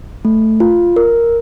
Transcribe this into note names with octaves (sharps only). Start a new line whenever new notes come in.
A3
F4
A#4